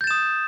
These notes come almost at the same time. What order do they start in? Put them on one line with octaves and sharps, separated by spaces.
G6 A6 E7 D#6